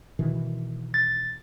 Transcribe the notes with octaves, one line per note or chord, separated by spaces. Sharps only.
B2 D#3 E3
A6